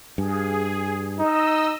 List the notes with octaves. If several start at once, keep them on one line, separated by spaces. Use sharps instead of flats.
G2 G#4
D#4 D#5 E6